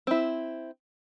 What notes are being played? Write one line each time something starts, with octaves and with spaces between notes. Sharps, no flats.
C4 E4